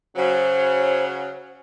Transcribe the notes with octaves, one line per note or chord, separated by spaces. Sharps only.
C#3 F#3 C5